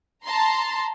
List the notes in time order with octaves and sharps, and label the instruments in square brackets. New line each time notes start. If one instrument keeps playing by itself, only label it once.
[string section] A5 A#5 C6